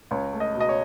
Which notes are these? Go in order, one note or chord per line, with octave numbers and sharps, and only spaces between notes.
C#2 C#5
A3
D#5
B2
D#5
C#5